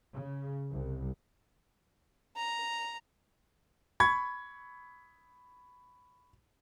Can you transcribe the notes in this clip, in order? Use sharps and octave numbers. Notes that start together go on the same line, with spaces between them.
C#3
C2
A#5
B5 C#6 G#6